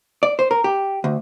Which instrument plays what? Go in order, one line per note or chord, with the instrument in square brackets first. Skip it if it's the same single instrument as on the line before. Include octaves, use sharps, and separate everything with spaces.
[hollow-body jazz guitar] D5
C5
A#4
G4
D2